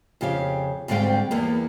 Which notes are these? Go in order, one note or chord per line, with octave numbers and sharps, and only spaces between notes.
F2 C#3 G4 F5
D2 G#2 G3 C4 F5 G5
E2 A#3 B3